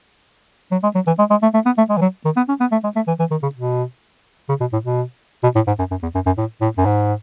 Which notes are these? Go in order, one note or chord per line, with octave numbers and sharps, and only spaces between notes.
F#3
G#3
F#3
E3
G#3
G#3
A3
A3
B3
A3
G#3
E3
F#3
D#3
B3
C#4
B3
A3
G#3
A3
E3
E3
D#3
C#3
B2
C#3
B2
A2
B2
B2
A2
G#2
F#2
F#2
E2
F#2
F#2
A2
A2
F#2
G#2